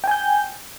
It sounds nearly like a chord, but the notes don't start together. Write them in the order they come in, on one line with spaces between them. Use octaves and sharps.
G5 G#5 G6